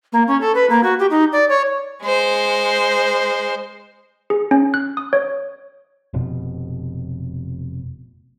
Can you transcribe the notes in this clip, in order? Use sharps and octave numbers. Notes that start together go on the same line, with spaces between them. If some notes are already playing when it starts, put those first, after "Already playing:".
A#3
C#4
A4
B4
A#3
F#4
G4
D#4
D5
C#5
G#3 C5
G#4
C#4
F#6
D#6
C#5
F1 B2